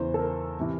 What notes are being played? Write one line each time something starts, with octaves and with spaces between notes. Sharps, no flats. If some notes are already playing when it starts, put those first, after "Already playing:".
Already playing: E2 C#3 E3 C5
A4
A#4
C3 E3